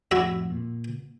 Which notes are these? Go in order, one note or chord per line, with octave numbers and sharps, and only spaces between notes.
F2 A2 E4 F#4 E5
A#2